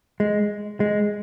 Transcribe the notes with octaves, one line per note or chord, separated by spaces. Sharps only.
G#3
G#3